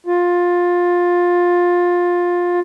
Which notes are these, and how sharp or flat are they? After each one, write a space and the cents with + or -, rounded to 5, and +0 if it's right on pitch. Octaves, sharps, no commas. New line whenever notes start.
F4 +15